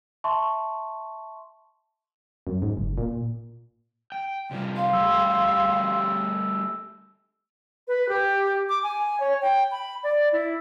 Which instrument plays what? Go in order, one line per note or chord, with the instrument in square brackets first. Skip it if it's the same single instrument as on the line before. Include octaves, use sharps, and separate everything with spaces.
[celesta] E5 A5 C6 C#6
[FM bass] F#2
G#2
F#1
A#2
[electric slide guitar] G5
C3 G3 F4
[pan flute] F5 [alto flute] C6
[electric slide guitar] G3 A3 G4 [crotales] E6
[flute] B4
G4
D6
G#5
C#5
G5
B5
D5
E4